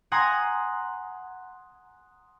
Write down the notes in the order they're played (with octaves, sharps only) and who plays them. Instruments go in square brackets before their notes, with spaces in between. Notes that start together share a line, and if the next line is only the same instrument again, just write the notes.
[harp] F#5 G#5 A#5 C6 D#6